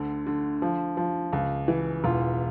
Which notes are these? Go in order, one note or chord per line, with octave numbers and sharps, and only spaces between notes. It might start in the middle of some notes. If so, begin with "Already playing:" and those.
Already playing: D2 D3
D3
F3
F3
C#2
E3
E1 F4